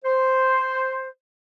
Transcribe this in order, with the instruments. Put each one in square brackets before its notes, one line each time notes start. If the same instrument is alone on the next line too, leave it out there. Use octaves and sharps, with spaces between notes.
[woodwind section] C5